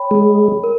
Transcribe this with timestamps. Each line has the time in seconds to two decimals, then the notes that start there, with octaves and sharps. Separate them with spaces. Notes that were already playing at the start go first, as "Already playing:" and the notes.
Already playing: C#5 G5 B5
0.11 G#3
0.64 A#4